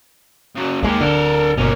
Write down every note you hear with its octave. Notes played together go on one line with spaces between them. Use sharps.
C#3 F#3
D#2 G#3 A#3 G4
D1 D3 A4 A#4
G1 B2 A#3 C#4